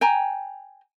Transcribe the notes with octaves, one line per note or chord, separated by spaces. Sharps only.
G5 G#5 A#5